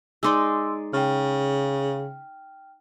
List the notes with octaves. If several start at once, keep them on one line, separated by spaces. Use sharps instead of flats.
G#3 D#4 D5 C6 D6 E6
C#3 G5 F6